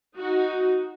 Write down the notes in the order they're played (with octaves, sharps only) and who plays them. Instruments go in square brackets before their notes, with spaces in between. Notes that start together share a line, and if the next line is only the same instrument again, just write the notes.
[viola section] D#4 F#4